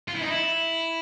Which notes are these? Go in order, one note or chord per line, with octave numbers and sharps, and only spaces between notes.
F4
E4
D#4
E4